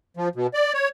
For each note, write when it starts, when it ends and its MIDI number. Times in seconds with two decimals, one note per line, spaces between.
0.17 0.28 53
0.35 0.47 47
0.54 0.73 74
0.74 0.88 73